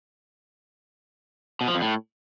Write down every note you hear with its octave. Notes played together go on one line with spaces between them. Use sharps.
B2
F3
F2
A2